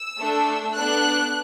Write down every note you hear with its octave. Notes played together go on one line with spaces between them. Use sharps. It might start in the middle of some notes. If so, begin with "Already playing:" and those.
Already playing: E6
A3 D4 A4
B3 D4 A4 F#6